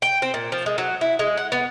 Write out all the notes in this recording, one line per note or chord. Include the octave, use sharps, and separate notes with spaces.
G5
C4
A#2
F3
G#3
F#3
E4
G#3
F#5
B3